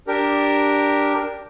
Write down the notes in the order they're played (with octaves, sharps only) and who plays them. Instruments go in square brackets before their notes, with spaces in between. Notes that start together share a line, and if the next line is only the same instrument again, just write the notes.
[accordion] D4 G4 A#4